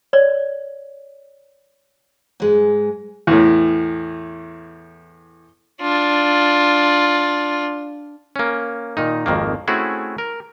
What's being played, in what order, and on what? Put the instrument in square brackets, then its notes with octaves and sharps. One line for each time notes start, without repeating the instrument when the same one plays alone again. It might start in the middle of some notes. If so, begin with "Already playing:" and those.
[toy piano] C#5 D5
[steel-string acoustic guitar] G#2 G#3
[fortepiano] E2 A2
[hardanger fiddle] D4 F4
[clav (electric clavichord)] A#3 C#4
A#2 D#3 D#4
G#1 F2 D#3 A#3
A3 C4 C#4 E4 F#4 G#4
A#4